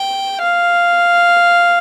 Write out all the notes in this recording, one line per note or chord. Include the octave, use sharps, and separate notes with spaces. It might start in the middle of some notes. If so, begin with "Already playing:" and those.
Already playing: G5
F5